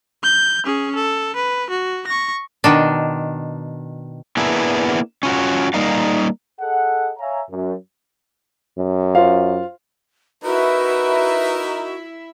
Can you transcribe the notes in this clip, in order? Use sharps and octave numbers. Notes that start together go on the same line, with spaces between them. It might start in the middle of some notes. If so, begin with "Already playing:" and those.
G6
C#4 G#4
A4
B4
F#4
C#6 A#6
B2 D#3 D4
A#3 B3 D4 E4 G#4 B4
C#4 F4 F#4
G3 A#3 D#4 F5
G#4 A4 D#5 F#5
C#5 E5 F5 G#5 A#5
F#2
F#2
F4 C5 F5
D#4 E4 F#4 A#4 B4 E5